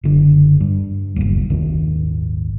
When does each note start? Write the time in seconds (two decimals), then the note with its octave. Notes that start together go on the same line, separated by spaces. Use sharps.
0.04 F#1 D3
0.60 G2
1.16 F#1 D#2
1.50 D#1 G#1 D#3